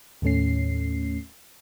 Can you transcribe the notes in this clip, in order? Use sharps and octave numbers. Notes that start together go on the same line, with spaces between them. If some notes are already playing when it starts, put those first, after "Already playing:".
D#2 A2 A3 C#4 C7